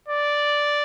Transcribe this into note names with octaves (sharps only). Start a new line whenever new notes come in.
D5